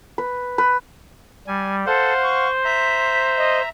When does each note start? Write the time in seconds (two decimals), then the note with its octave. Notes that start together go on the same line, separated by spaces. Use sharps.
0.18 B4
0.58 B4
1.47 G3 G#5
1.86 A4 C5 F5 F#5
2.23 C#6
2.65 E5 A#5 B6
3.37 D#5